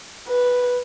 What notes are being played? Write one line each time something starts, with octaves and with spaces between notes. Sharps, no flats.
B4